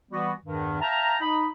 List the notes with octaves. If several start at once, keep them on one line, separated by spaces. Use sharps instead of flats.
E3 G3 B3 F#4
E2 G2 D#3
E5 F5 G5 A5 A#5
D#4 B5